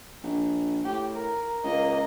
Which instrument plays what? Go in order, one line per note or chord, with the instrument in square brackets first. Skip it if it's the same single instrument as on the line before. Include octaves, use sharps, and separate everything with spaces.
[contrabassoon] A#1
[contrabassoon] A2 [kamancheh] G4
[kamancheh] A#4
[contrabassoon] C#2 [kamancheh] A#3 D#5